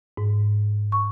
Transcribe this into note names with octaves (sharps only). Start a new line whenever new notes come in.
G#2
C#6